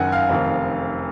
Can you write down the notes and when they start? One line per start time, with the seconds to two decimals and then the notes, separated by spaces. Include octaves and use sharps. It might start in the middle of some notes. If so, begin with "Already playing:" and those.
Already playing: F#1 F#2 D#3 F#5 G#5
0.12 F5
0.29 F1 F2 D#3